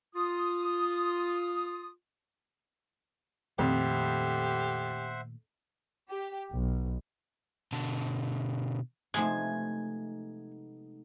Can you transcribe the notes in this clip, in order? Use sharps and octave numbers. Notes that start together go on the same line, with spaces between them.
F4 D#6
F2 A#2 D#3 A3 G4 C5 E5 F#5
G4
B1
B2 D3 A5
C3 F3 G#3 A3 B3 D#4 G#5